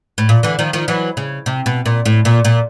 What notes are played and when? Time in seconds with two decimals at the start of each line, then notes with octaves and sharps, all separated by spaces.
0.18 A2
0.29 A#2
0.43 D3 E3
0.59 D#3 F3
0.73 D#3 F3
0.88 E3 F#3
1.17 C#3
1.46 C3
1.66 B2
1.86 A#2
2.05 A2
2.25 A#2
2.45 A#2